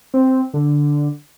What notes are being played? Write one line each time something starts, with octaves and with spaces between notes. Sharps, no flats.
C4
D3